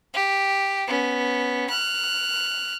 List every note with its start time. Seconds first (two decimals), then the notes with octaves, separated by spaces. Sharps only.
0.14 G4
0.87 B3 C#4
1.69 F6 F#6